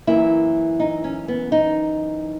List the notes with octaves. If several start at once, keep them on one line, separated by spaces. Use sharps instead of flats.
F#2 E3 A#3 E4
D#4
C#4
B3
D#4